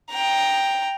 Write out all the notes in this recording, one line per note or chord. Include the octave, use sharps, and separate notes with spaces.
G5 A#5